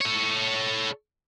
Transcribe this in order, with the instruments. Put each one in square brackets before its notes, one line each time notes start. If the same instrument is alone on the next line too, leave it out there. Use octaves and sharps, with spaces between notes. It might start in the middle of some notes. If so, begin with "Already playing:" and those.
[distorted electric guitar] A4 C#5